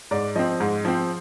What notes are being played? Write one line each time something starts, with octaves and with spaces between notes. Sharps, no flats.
G#2 D5
F3 C4 D#5
G#2
F3 C4